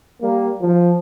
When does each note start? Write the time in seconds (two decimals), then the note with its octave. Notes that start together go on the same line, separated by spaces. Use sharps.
0.21 G3 A#3
0.61 F3